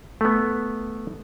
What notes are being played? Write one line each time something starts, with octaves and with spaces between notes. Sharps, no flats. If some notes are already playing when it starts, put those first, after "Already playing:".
A3 B3